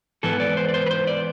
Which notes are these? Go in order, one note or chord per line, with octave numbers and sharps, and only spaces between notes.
G#2 E3 B3 A4
D5
C5
D5
C5
B4
C5
D5